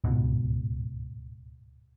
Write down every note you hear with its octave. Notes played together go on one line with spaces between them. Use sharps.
D1 C#2 G#2 B2